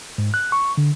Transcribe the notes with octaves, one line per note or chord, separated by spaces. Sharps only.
G#2
F#6
C#6
D3